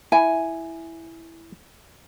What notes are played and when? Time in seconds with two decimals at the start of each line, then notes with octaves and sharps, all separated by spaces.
0.12 E4 G#5